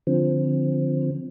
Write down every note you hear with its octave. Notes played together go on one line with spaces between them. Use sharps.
D3 F3 C4